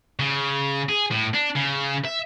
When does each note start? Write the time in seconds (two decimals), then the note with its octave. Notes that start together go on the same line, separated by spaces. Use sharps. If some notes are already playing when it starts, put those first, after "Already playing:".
0.19 C#3
0.89 G#4
1.11 A2
1.34 D4
1.56 C#3
2.05 E5